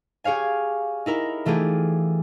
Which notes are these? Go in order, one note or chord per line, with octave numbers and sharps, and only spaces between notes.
G4 G#4 C#5 F5 G#5
D#4 E4 A#4
E3 A3 F4 G4 G#4